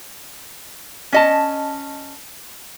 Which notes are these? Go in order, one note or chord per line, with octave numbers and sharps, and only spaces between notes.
C#4 D#5 A5